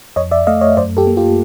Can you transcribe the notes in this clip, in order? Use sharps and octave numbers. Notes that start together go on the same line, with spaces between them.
F2 C#5 D#5
D5 E5
A3 D#5 F5
C#5 D#5
F#2 C5 D5
G4 A4
A#3
F4 G4